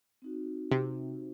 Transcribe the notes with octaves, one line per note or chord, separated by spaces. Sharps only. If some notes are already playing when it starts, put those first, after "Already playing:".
C4 D#4 F#4
C3